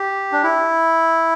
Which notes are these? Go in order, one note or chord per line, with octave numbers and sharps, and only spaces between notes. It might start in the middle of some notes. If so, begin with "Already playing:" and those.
Already playing: G4
D4
E4